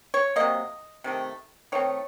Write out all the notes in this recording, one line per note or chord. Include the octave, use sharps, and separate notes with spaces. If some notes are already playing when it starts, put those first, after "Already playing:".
C#5
C3 F#3 A#3 D#5
C3 D#3 A3
D#3 A3 C4 C#5